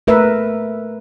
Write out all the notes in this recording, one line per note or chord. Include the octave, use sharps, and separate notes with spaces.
A3 A#4 B4 E5